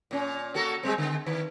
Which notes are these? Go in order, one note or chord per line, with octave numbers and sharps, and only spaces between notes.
A#2 C#4
A#3 F#4 A4
G3 G#3 C4
D3
D#3